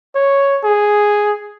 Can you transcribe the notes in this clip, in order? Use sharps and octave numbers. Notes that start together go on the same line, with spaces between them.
C#5
G#4